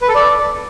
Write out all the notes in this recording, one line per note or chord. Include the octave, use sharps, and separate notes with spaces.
B4
A4
D5